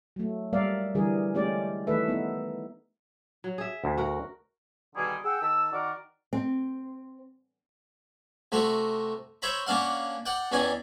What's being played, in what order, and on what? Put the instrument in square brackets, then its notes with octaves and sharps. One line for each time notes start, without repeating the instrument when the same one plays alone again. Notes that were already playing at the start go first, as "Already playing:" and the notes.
[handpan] F#3 A3
G3 A#3 A#4 D5 E5 F5
D3 E3 G3 G#4 A#4
G#3 A3 C#4 G4 D5
D#3 E3 A3 A4 B4 E5
B3 D#4
[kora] F#3
G#4 E5
[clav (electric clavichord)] D2
[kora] F#4 A#4
[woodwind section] B2 D3 D#3 G3 G#4
G#4 F#5 G5 E6
D#3 A5 E6
D#3 F#4 A#4 D5
[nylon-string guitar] C4
[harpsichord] C3 A3 F#4 A#5
C5 C#5 E5 A#5 B5
A#3 C#4 D4 F5 F#5
D5 F#5 G5
E2 D#3 C#4 D5 G#5